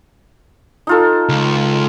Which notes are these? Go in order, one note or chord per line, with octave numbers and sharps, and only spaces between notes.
D#4 F4 A4
C#2